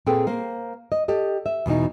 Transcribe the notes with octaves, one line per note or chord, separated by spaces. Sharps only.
A#2 C4 G#4 A4 B4 G5
A#3 C5
D#5
G4 A4 D#5
E5
E2 B2 E3 D#4